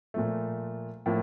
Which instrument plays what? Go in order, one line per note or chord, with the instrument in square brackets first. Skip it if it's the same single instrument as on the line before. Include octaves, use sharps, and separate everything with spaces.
[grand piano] A#2 F3 A3
A2 F3 A#3